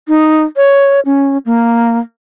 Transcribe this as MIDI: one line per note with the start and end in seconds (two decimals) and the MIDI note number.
0.08 0.43 63
0.56 1.00 73
1.05 1.38 61
1.46 1.98 58